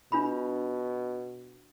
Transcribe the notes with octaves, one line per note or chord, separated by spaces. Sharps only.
B2 D4 F4 B5